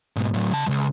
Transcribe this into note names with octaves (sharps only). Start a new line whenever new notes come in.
G#2 B2
A2 F#3
C#3 A5
C#2 F#2